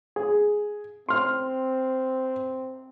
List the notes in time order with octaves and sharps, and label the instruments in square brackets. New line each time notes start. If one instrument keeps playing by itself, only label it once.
[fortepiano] G#4
[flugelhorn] C4 [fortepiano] C6 F6